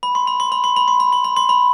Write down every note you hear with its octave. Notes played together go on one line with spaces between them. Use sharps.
B5
C6
B5
C6
B5
C6
B5
C6
B5
C6
B5
C6
B5